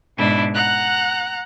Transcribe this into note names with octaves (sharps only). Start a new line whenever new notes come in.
G#2 B2 D4 E4
F#5 A#5 F#6